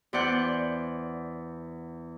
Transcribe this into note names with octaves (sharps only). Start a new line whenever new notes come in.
E2 C5 D5 F#5 F#6 G6